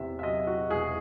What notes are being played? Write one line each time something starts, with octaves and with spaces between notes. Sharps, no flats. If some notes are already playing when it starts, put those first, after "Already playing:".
Already playing: E2 C3 E5
E5
F#3 D#5
F#4
E1 G#4